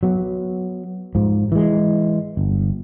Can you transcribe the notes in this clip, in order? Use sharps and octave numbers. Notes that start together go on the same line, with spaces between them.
F#3 B3
G#2 F3
E3 G#3
G1